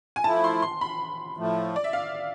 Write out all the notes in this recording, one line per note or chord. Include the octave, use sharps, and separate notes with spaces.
G#5
F3 A3 E4 A5
C6
C6
B5
A2 F3 A3
D5
E5
F5